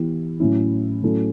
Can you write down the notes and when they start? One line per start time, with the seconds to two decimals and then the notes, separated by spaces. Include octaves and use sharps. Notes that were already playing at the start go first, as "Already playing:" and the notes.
Already playing: E3 B3 E4 G4
0.40 A2 F#3 C#4 E4
1.02 A2 F#3 C#4 E4 A4